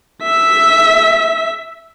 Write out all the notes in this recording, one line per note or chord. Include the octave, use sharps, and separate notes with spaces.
E5 B6